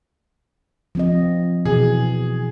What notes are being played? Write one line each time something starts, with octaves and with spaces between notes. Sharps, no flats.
F3 C4 D#5
B2 E3 G#4